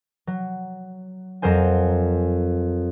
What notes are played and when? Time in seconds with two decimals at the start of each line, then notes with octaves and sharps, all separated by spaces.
0.27 F#3
1.42 F2 F#3 A#4 C5 G#5